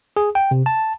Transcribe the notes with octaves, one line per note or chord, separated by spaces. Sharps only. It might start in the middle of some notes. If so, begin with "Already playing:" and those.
G#4
G5
C3
A5